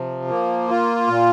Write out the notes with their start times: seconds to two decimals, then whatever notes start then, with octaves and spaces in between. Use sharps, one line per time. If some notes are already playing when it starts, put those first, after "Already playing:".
Already playing: C3 F3
0.28 A#3
0.68 F4
1.07 A#2